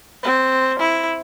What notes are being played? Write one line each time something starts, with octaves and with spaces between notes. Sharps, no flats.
C4
E4